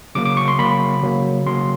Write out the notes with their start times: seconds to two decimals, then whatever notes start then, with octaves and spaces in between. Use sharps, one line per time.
0.15 C#3 F#3 A#3 D6
0.25 D6
0.37 C#6
0.48 C6
0.59 C#3 F#3 A#3 B5
1.02 C#3 F#3 A#3
1.46 C#3 F#3 A#3 C6